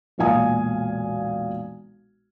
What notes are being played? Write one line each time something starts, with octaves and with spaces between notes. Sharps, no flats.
E1 B1 A#2 F5 G#5 D#6